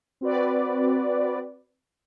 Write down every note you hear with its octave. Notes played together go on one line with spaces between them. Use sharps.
C4 F#4 B4 D5